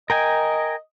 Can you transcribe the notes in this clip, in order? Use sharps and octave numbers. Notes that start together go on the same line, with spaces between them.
A#4 D#5 G5 G#5